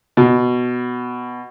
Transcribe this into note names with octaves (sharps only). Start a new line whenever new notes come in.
B2